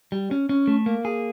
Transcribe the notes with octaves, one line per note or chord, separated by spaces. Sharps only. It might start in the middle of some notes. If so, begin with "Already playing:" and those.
G3
C#4
C#4
A3
A#3
G#4